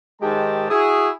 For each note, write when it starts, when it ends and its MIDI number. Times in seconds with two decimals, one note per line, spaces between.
0.21 0.66 44
0.21 0.66 51
0.21 0.66 56
0.21 0.66 67
0.21 0.66 81
0.70 1.09 64
0.70 1.09 66
0.70 1.09 68